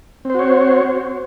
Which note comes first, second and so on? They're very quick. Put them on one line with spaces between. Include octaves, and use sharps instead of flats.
C4 C5 F#4 C#5